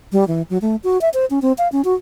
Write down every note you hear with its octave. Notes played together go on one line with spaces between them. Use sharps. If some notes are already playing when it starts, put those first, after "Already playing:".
G3
E3
F#3
A3
F#4
E5
C5
C#4
C4
F5
C#4
F#4